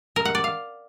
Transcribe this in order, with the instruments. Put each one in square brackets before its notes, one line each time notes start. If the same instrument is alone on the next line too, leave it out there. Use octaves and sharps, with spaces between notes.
[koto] A#4
F#5
D5
F5